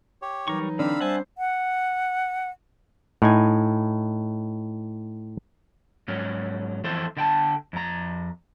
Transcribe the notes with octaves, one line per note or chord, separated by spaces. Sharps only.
G4 C#5
E3 F#3 G3 D#4 A#4 C#6
D3 C4 D4 D5 F5 B5 E6
G3 C5 E5 F#5 G#5 A5
F#5
A2 D#4 G#5
G#2 F#3 C#4
F2 E3 A4 C5
D3 G5 A5
F2 A#5